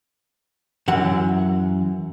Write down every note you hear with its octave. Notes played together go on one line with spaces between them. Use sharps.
F#2 E3 F#5